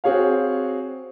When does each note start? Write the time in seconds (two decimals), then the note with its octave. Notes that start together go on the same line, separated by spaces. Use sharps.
0.04 C4 F#4 G#4 C#5 F5